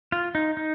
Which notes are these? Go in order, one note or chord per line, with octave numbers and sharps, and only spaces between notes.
F4
D#4
D#4